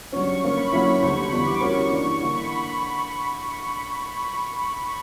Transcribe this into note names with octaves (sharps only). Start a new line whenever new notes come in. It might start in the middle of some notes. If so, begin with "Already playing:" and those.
G2 F#3 C#4 C#6
C#6
D3 A#3 C#4 C#6
B5
D3 F#3 A#3 C#4 E4
C#6
D2 C#3 G3 C#6
B5
E2 D3 G3 B3 D4 C#6
D6
D6
E3 G3 C#4 F#4 A#4 C#6
G2 E3 A#3 D4
D3 A#3 E4 C#6
B5